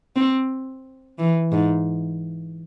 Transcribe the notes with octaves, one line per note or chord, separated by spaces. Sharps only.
C4
E3
G#2